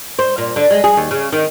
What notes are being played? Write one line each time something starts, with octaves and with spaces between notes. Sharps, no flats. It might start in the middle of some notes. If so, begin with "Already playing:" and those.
C5
A#2
D3
G#3
G#4
D#2
C#3
D#3